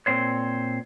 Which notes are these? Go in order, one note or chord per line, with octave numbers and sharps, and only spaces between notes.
A#2 E3 C4 C5 C#5